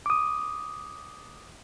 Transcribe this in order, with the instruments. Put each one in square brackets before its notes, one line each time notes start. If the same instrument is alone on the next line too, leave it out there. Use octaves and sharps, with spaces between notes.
[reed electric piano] D6 D#6